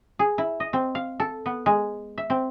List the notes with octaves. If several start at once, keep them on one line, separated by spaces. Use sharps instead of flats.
G#4
E4
D#5
C4
F5
A4
B3
G#3
E5
C4